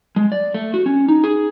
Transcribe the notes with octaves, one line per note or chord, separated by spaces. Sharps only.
G#3
D5
A3
F#4
C#4
D#4
G#4